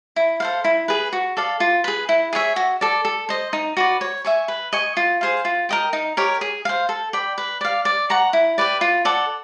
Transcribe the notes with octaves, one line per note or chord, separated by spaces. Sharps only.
E4
A4 C5 F5
E4
G#4 B4
F#4
A4 D5 F5
F4
G#4 B4
E4
G#4 C#5 E5
F#4
A4 D5
A4
C5 D#5
D#4
F#4 B4 D5
C#5
E5 G#5 C#6
B4
D#5 G#5 C#6
F4
G#4 C5 F5
F4
A#4 D#5 G5
D#4
G4 A#4 C#5
G#4
C5 F5
A4
D5 G5 B5
B4
D5 F5
D5
F#5 A#5 C#6
E4
G4 B4 D5
F4
A4 D5 F#5